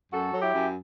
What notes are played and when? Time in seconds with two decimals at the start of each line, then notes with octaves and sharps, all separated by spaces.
0.12 F#2 F#4 A4
0.34 F#3
0.40 E4 G4
0.55 F#2